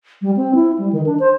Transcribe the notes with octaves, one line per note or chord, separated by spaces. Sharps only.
G3
C4
E4
G3
D#3
D4
C5